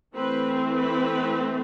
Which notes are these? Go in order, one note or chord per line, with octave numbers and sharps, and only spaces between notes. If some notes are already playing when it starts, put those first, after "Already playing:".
E3 A3 C4 B4
B4